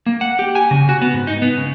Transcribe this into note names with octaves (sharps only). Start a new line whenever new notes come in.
A#3
F#5
G4
G#5
C#3
F#4
B3
G#2
D#4
B3
C#3